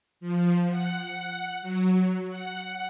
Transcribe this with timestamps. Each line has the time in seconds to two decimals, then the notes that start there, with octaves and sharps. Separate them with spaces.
0.21 F3
0.69 F#5
1.62 F#3
2.29 F#5